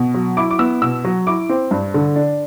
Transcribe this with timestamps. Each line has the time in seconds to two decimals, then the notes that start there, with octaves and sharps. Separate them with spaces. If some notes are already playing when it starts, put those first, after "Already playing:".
Already playing: B2
0.14 F#3
0.37 E4 D6
0.51 D6
0.59 B3 E6
0.82 B2 E6
1.05 F#3
1.27 E4 D6
1.49 C4
1.71 G2
1.94 D3
2.16 D4